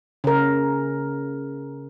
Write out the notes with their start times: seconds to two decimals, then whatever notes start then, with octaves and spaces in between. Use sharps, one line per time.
0.24 C#3 A#4